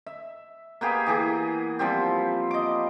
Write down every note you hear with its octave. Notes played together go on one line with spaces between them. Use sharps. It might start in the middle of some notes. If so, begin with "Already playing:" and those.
E5
A#3 B3 G4 G#4
E3 G4 G#4
F3 G3 C4 G4
D#5 D6